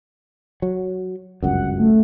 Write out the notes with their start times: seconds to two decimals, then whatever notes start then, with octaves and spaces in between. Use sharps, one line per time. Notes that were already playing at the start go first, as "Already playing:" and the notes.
0.62 F#3
1.43 G1 C#2 F#2 F#5
1.79 A3